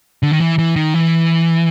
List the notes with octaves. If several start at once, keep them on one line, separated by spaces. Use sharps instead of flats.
D3
D#3
E3
E3
D#3
E3